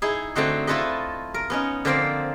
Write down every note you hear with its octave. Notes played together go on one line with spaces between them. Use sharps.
D#4 E4 G#4
D3 A3 C4 D#4 F#4
A3 E4 F4 A4 B4 D#5
A#4
B3 C#4 D#4
D3 F3 A#3 C4 A#4 C5